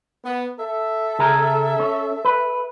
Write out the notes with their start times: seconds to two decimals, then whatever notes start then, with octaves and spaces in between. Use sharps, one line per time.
0.24 B3
0.59 A4 E5
1.19 C#3 G#4 A#4
1.80 C#4
2.25 B4